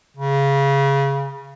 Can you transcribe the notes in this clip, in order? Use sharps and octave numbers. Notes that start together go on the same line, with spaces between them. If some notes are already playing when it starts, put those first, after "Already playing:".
C#3